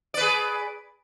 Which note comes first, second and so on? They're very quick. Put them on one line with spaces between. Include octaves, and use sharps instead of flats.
D5 B4 G#4